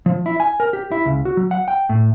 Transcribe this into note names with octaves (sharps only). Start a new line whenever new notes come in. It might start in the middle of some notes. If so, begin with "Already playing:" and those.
F3
E4
G#5
A#4
G4
E4
C#2
F#4
F#3
F#5
G5
A2